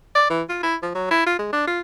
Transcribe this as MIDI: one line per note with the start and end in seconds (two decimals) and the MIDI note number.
0.15 0.25 74
0.30 0.42 52
0.49 0.62 65
0.63 0.76 64
0.82 0.91 53
0.95 1.10 54
1.11 1.26 64
1.26 1.36 65
1.39 1.50 56
1.53 1.66 62
1.67 1.80 65